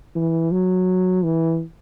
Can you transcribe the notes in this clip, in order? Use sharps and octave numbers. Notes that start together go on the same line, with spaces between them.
E3
F#3
E3